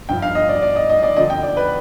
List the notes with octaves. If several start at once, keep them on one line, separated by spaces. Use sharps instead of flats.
G2 F3 G5
F5
D#5
D5
D5
D#5
D#5
D5
F2 D3 F3 D#5
G5
D5
B4